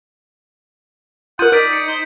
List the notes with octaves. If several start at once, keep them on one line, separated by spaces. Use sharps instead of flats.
F4 A#4 F#5 D#6 G6 D#7
D#4 A#4 D5 B6 D7 D#7
C#7
C5